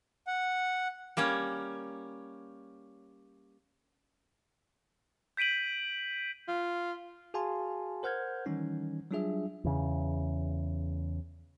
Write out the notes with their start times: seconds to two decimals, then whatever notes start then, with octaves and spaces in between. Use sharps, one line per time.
0.27 F#5
1.17 G3 A#3 C#4 C#5
5.37 G6 B6 D7 D#7 F#7
6.48 F4
7.34 F#4 G#4 F5 G#5 A5 C6
8.03 A#4 C5 F#5 F6 G6 G#6
8.46 D#3 E3 G3 C#4 D#4
9.11 F#3 G3 D4 F4 G#4 E5
9.64 E2 C#3